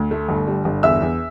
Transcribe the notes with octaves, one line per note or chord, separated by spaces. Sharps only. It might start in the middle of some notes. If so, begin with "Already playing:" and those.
Already playing: D2
A3
G1
G3
G1
E2 E5 E6
E2